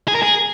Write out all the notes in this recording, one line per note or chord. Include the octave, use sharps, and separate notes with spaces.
G#4
A#4
G#4